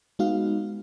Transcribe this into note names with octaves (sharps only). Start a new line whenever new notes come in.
G#3 B3 D#4 F#4 F5